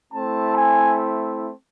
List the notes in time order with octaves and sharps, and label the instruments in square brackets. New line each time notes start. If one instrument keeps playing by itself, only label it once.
[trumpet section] A3 C4 E4 A5
G#5